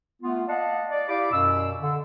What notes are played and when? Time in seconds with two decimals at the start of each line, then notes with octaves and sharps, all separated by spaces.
0.22 A3 B3 F4
0.48 D5 D#5 F5 F#5 A5
0.90 D5
1.09 E4 G4 F5 B5 D6
1.32 F#2 B2 B5 E6
1.82 D3